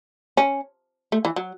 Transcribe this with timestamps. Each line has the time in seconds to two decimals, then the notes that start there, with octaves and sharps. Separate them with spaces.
0.37 C#4
1.12 A3
1.25 E3
1.36 F#3